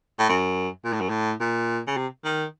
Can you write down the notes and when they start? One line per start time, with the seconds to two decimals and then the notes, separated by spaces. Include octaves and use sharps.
0.19 A2
0.29 F#2
0.85 A#2
0.93 A2
1.01 F#2
1.09 A2
1.40 A#2
1.87 C#3
1.97 C3
2.25 D#3